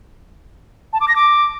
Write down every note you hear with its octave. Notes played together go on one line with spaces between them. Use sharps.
A5
D6
A#6
D6